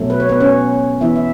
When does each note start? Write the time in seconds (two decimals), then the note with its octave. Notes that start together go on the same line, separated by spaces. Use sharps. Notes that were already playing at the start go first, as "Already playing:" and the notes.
Already playing: B2 F#3 A3
0.10 B4
0.20 C#5
0.29 B3 B4
0.40 C#4 C#5
1.01 E3 B3 E4 E5
1.16 E5